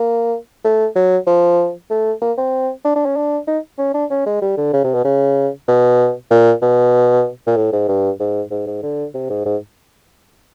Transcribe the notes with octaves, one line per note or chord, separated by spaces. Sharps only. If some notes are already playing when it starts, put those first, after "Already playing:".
Already playing: A#3
A3
F#3
F3
A3
A#3
C4
D4
D4
C#4
D4
D#4
C#4
D4
C#4
G#3
G3
D3
C#3
C3
B2
C#3
B2
A#2
B2
A#2
A2
G#2
G2
G#2
G#2
G#2
D3
C3
G#2
G#2